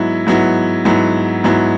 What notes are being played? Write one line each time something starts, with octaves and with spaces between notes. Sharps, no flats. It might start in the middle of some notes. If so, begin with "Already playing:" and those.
Already playing: G#2 F#3 B3 E4
G#2 F#3 B3 E4
G#2 F#3 B3 E4
G#2 F#3 B3 E4